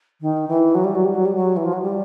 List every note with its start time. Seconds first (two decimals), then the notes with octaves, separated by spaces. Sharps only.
0.21 D#3
0.48 E3
0.75 F#3
0.84 G3
0.95 F#3
1.05 G3
1.15 F#3
1.25 G3
1.35 F#3
1.57 E3
1.65 F3
1.73 F#3
1.82 G3